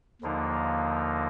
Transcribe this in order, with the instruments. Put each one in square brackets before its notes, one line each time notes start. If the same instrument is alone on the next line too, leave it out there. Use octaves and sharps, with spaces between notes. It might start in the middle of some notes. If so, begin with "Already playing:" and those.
[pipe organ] D#2 D3 F3 A#3 D#4